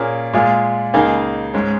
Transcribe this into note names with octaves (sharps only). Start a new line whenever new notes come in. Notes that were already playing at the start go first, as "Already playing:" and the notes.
Already playing: A#2 A#3 C#4 G#4
A#2 G#3 F4 G#4
C#2 C#3 A#3 D#4 G#4
G#2 G#3 C#4